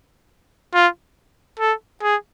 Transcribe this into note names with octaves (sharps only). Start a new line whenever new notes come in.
F4
A4
G#4